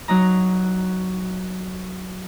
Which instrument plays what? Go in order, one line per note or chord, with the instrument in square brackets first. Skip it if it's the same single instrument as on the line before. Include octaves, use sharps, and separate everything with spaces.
[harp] F#3 D#4 A#5